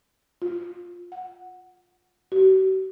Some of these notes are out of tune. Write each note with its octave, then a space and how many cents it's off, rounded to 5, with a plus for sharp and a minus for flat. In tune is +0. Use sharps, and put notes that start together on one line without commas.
F4 +10
F#5 -5
F#4 +45